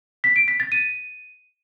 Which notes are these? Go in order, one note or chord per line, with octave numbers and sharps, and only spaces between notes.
B6
D7
B6
A6
D#7